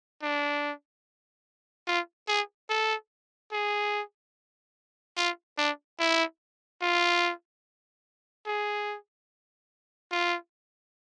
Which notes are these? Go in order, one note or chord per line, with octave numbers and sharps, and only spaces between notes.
D4
F4
G#4
A4
G#4
F4
D4
E4
F4
G#4
F4